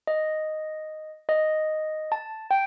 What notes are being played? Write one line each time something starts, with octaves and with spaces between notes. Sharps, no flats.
D#5
D#5
A5
G5